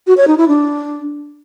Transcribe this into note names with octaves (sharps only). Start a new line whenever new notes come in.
F#4
C#5
D#4
E4
D4